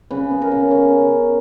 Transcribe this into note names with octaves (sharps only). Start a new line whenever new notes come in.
C#3 B4
B3
A#4
C#3
C#3 C#5